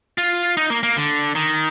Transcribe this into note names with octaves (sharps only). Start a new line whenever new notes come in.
F4
D#4
A#3
A#3
D3
D#3